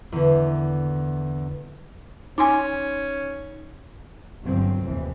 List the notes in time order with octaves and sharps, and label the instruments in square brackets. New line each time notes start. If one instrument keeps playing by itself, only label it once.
[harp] E2 D3
[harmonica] C#4 [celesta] D#4 [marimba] G#5 C6 D6
[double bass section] G1 F3 F#3 C4
F1 D#2 E3